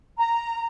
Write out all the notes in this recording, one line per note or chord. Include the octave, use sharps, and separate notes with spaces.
A#5